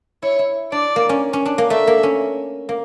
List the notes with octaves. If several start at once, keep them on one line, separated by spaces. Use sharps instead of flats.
E4 C#5
E4
D4 D5
A#3
C#4
C#4
D4
A#3
A3 E5
A#3
C#4
A#3